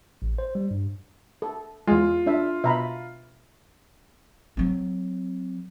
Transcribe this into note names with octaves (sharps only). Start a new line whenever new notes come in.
A1
C5
G3
G2
A4
E2 G#3 F4
D4 A4 E5
B2 E5 A#5 B5
F#3 C4